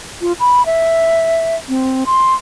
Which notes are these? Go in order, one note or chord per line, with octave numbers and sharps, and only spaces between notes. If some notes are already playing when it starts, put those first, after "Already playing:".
F4
B5
E5
C4
C6